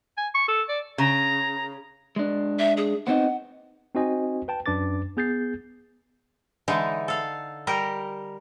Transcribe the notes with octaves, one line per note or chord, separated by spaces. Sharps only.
G#5
C#6
A4
D5
C#3 A#5
G#3 D4
E5
G#4
B3 C4 D#4 F#5
C4 D#4 F#4 C5 D#5 G#5
B4 G5 A5
F#2 D4 B4 D6 A6
B3 G#4 G6 A6 C7
D3 E3 G#3 D#4
A4 F5
G3 G4 A#4